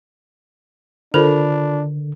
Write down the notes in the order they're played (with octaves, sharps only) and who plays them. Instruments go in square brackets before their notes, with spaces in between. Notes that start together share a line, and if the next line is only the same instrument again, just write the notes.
[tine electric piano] D3 [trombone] D4 [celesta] F4 B5 F7 [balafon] A4 A#4 C5